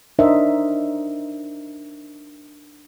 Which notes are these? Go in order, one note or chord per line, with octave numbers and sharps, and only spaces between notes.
D4 D#4 A#4 C5 D#5 E5